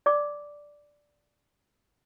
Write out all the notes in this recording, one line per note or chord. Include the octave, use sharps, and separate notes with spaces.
D5 D6